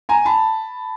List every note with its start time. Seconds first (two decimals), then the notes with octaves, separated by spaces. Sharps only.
0.09 G#5 A#5
0.25 A5 B5